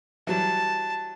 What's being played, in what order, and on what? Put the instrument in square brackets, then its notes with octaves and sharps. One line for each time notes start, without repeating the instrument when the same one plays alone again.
[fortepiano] E3 F#3 G3 [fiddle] A5